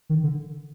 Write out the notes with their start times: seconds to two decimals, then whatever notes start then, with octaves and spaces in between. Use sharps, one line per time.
0.10 D#3
0.23 D3